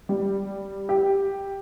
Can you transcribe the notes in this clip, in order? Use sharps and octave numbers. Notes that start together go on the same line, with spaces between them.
G3
G4